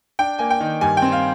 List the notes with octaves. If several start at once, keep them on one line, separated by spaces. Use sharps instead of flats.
D4 G5
A#3 G#5
G5
D#3
G2 G#5
G5
C4
F5